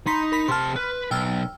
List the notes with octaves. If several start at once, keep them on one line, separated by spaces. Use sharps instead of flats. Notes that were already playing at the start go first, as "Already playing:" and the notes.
D#4 B5 C6 B6
A#4 B5 B6
C3 A5 C6 F6
B4
B1 G5 E6 F6